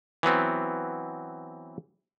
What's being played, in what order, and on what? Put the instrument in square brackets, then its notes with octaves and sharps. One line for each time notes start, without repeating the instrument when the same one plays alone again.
[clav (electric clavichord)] E3 F#3 B3 C4